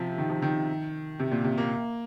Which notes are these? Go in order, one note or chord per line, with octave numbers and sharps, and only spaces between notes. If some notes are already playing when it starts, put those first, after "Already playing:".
Already playing: C3 F3
D#3
F3
D#3
C3
A#2
C3
A#3